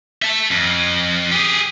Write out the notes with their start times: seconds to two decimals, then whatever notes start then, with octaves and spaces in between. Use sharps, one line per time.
0.22 E5 A5
0.51 F2
1.31 G4 G#4